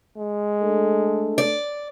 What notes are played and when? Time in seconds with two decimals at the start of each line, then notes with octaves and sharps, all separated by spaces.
0.17 G#3
0.62 A3 D4 A4
1.38 D5